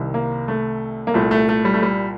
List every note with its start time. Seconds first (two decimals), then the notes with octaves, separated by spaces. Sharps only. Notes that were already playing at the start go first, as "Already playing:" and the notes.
Already playing: C2 C3 D#3
0.14 A#3
0.48 A3
1.07 A#3
1.14 C2 A#2 A3
1.31 A3
1.49 A3
1.65 G3
1.74 A3
1.82 G3